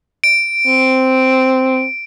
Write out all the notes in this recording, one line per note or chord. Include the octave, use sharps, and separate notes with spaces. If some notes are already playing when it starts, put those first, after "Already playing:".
D7
C4